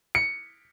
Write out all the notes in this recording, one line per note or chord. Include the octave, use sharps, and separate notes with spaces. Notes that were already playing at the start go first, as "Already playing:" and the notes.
C#7